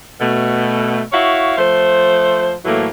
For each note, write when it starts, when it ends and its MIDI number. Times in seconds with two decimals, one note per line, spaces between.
0.20 1.01 47
0.20 1.01 57
1.12 1.55 64
1.12 1.55 66
1.12 1.55 73
1.12 1.55 76
1.12 1.55 77
1.58 2.53 53
1.58 2.53 57
1.58 2.53 72
2.65 2.87 45
2.65 2.87 52
2.65 2.87 54
2.65 2.87 57
2.65 2.87 58